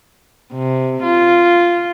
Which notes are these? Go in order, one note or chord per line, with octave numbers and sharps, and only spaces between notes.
C3
F4